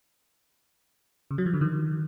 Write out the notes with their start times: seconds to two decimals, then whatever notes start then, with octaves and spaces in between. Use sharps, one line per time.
1.31 C#3
1.38 F#3
1.46 F3
1.54 D3
1.61 D#3